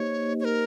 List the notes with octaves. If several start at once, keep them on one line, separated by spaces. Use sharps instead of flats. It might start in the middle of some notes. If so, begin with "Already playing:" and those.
Already playing: A#3 D#4 G4 C5 C#5 D#5
C#5
A#4